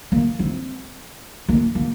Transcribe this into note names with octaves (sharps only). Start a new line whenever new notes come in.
A#3
C4
A#3
A#3